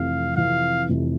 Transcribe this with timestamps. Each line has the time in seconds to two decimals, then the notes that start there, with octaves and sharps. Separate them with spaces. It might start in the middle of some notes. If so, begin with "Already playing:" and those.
Already playing: F1 F2 C3 E3 F5
0.36 F1 F2 C3 E3 F5
0.89 F1 F2 C3 E3